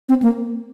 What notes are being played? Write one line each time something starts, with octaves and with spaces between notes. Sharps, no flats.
C4
A#3